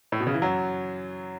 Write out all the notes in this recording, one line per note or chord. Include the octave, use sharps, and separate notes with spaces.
A2
B2
C#3
E3
F#2 F#3